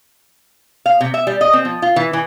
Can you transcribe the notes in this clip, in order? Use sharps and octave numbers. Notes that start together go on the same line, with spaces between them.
F5
C3
E5
G3
D#5
C4
F3
F4
E3
E3